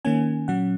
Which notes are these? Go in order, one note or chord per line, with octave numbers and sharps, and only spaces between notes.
D#3 A#3 C#4 G#5
A#2 F#3 C#4 F#5